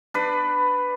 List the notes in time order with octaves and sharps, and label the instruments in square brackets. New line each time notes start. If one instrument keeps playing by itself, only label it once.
[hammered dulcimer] D4 B4